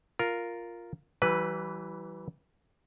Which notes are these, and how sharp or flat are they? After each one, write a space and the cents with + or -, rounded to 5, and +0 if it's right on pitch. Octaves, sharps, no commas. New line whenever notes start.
F4 +0 A#4 +0
E3 +0 G3 -45 B4 +0